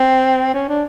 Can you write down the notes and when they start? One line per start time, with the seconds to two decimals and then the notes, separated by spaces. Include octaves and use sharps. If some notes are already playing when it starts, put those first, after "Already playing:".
Already playing: C4
0.54 C#4
0.68 D4